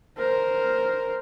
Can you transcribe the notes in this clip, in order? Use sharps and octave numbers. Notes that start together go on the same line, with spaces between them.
A#4 C5